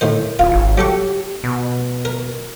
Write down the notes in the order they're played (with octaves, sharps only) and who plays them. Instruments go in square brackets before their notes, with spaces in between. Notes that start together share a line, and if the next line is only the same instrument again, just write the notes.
[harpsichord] A2 D#3 C5
[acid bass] D1 [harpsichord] F4
[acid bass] G#1
[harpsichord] F#3 A4 C#6 [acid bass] G4
[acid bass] B2
[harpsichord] A#4